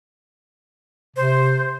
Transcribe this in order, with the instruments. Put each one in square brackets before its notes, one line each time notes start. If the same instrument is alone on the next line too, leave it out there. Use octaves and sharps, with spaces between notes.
[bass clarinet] C3 [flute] C5